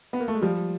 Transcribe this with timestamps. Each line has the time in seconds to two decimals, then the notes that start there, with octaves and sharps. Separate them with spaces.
0.13 B3
0.20 A#3
0.28 A3
0.34 G#3
0.41 F3 G3